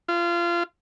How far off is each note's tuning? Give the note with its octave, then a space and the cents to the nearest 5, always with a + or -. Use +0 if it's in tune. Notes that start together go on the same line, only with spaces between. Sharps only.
F4 -25